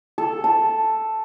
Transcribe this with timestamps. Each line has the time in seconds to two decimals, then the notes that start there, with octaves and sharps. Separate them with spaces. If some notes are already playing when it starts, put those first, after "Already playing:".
0.18 A4
0.44 A5